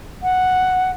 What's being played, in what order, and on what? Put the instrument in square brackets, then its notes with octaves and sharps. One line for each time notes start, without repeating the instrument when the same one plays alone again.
[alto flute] F#5